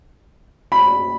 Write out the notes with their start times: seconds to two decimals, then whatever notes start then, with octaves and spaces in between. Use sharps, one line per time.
0.72 B5